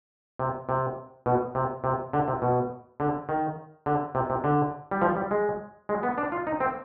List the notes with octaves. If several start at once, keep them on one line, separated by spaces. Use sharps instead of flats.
C3
C3
B2
C3
C3
D3
C3
B2
D3
D#3
D3
C3
C3
D3
G3
F3
G3
G#3
G#3
B3
D4
F4
D#4
C4